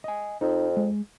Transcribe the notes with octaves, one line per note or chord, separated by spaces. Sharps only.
D#5 G#5
F2 D#4
G#3